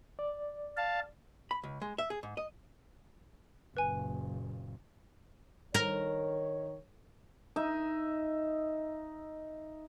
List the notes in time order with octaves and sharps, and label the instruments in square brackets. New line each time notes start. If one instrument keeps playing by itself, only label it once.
[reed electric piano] D5
[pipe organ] F5 A5
[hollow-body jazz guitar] B5
C#2
G#3
E5
G#4
G#2
D#5
[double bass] F#1 A#2 [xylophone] B4 G#5
[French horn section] D#3 C#5 [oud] A#4
[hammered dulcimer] D#4 E5